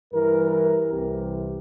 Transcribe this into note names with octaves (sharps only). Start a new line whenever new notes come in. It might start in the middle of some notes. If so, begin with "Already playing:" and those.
G2 E3 A#4
A#4
C2 C3 E3 G4